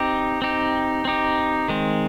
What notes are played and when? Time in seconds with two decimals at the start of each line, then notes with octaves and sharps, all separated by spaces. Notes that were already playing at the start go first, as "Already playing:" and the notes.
Already playing: C4 D#4 G4
0.42 C4 D#4 G4
1.05 C4 D#4 G4
1.68 D#3 G#3 C4